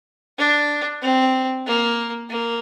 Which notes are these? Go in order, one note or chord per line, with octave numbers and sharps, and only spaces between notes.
D4
C4
A#3
A#3